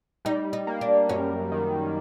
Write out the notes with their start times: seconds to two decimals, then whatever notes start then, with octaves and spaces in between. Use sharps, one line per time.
0.25 G3 D#4
0.53 D#4
0.67 A#3
0.81 D4
1.09 F#2 C#4
1.52 D#3